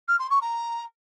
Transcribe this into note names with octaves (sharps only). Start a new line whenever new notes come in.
F6
C6
C#6
A#5